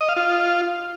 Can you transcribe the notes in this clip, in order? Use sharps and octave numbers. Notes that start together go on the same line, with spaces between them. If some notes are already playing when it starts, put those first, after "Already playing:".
D#5
F5
F4